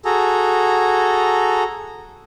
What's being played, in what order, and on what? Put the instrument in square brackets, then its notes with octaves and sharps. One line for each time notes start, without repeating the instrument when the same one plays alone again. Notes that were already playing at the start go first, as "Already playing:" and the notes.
[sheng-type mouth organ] F#4 G#4 A4 A#5